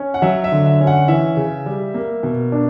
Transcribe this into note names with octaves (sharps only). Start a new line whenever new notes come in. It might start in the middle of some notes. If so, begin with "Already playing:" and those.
Already playing: C#4
F#5
F#3 E5
E5
D3
E5
C#4
F#5
E3 E5
C#3
G3
A#3
B2
D4